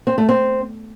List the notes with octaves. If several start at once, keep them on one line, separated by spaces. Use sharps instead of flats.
C4
A3
C4